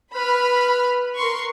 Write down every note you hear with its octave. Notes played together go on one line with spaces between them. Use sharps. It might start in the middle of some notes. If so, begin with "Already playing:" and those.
B4 B5 F6
A#4 C6 C#6